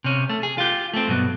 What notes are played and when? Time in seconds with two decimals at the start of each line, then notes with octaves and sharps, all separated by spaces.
0.04 C3 C#4
0.29 A3
0.43 G#4
0.58 F4 G4
0.94 A3 C4
1.08 G2 B2 F#3